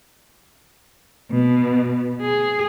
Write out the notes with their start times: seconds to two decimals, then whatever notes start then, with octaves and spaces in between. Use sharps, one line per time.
1.31 B2
2.22 G#4